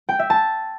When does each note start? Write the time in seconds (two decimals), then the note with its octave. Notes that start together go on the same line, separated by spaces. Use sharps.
0.09 G5
0.19 E5
0.30 A5